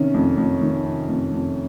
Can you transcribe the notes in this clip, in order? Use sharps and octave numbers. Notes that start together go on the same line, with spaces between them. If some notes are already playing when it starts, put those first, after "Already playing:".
Already playing: C3 D#3 C#4
F2
F2
D#3
C3
F2
F2